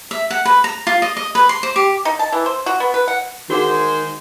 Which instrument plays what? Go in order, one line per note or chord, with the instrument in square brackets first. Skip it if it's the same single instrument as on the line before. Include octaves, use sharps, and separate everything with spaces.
[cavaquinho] E5
F#5
B4
A#5
F4
D#5
D#5
B4
C6
C5
G4
[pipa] D#4
A5
E3
C5
F#4
B3
B4
F#5
[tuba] D#3 [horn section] G#3 C5 [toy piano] F#4 G#4 F#5